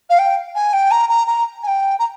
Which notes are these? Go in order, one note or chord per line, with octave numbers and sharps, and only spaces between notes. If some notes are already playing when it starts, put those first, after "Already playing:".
F5
G5
G#5
G5
A#5
A#5
A#5
G#5
G5
A#5